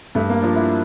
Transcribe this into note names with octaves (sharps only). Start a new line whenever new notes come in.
G2 A3
A#3
F3 D4
E4